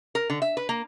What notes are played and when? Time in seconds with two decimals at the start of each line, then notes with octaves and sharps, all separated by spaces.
0.15 A#4
0.30 D3
0.42 E5
0.57 B4
0.69 A#3